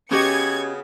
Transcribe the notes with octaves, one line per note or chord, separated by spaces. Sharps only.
C#3 B3 C#4 F#4 G4 D#5 G#6 C#7